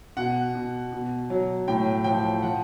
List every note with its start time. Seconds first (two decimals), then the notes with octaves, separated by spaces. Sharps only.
0.17 B2 F#5
0.55 B2
0.92 B2
1.30 F#3
1.68 A2 G5
2.04 F3 G5
2.42 F3 F#5